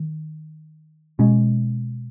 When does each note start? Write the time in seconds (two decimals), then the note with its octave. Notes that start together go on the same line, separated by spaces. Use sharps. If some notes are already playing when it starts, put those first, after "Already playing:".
Already playing: D#3
1.19 B2 G#3 C#4